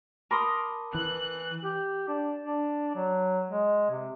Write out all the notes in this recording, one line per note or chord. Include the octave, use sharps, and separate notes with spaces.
A#4 A5 B5 C6 D6 D#6
E3 F#6
G4
D4
D4
F#3
G#3
C3